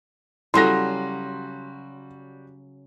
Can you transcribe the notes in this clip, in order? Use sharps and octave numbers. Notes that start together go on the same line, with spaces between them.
C#3 F#3 G3 E4 F#4 A4 C6 A#6